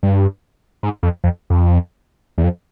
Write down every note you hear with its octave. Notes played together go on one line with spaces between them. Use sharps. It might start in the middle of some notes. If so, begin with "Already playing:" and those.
G2
G#2
F2
F2
F2
E2
F2